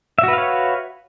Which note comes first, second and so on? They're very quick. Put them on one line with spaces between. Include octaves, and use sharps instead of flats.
E5 F#4 B4 F5 C#5